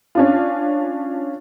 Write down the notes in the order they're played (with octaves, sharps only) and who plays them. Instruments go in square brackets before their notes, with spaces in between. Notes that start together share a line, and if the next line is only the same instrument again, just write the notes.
[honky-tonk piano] C#4 D4 F4